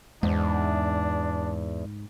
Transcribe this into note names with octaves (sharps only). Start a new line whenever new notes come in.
E2 G#2 D4